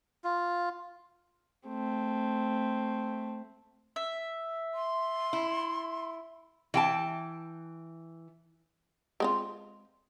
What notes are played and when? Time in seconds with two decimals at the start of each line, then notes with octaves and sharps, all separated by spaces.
0.24 F4
1.68 A3 C4
3.96 E5
4.74 C6
5.33 E4
6.74 E3 G5 A5
9.20 G#3 C4 F4